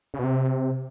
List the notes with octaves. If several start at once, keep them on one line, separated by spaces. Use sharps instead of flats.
C#3
B2
C3